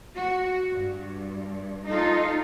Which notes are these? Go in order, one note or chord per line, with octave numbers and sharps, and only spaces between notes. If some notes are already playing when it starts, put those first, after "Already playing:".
F#4
G2
D#4 F4 A4